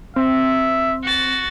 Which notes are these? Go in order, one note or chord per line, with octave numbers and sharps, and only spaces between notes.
C4 E5
F#4 A6